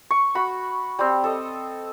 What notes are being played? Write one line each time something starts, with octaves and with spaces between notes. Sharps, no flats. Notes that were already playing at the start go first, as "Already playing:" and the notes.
C#6
F#4 B5
G3 C4
A4 D#5